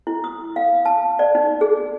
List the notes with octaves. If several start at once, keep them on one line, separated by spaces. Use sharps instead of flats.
E4
D#6
F5
A5
D5
D#4
G#4